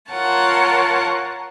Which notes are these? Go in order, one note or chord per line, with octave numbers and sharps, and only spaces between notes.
F4 A#4 C#5 F#5 A5